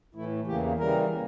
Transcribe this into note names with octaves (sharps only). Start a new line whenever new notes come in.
A2 E3 A3 E4
E2 C#3 E3 A#3 G4
C#3 E3 G3 A#4
A#3